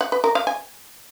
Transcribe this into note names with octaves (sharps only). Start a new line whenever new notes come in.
F#5
B4
A#4
F5
G#5